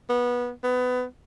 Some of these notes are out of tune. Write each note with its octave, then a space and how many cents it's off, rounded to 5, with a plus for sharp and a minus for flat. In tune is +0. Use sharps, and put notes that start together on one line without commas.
B3 -20
B3 +25